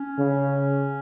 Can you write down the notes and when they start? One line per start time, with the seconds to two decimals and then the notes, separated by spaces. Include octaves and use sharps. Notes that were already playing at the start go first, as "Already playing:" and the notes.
Already playing: C#4
0.19 C#3